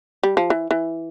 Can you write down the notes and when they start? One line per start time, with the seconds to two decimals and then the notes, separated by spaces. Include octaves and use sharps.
0.23 G3
0.37 F3
0.50 E3
0.71 E3